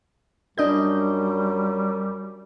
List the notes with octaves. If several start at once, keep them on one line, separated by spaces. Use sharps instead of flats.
F#2 G3 D4 D#5 G6